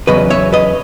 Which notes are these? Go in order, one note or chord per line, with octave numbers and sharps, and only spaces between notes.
E2 C#3 F#3 B4 D#5
C#5 E5
B4 D#5